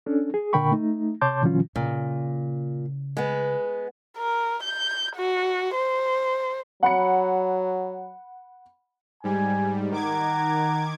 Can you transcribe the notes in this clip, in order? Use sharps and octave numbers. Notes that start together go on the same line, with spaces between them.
C#4 D4 A4
G#4
A#2 D3 A#4 G5 B5 C#6
A3 D#4
C3 C#5 A5 C6 D6 G6
A#2 D3 E3 F#3 C#4 F4
A#2 C#3
G#3 B3
A#4
G6
F#4
C5
F#3 F#5 B5 C#7
G#2 G3 G#5
D#3 F#5 A#5 D6 G#6